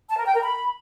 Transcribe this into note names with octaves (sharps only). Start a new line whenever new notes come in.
A5
A#4
G5
A#4
B5